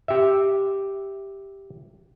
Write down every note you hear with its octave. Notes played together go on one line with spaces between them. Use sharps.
G4 E5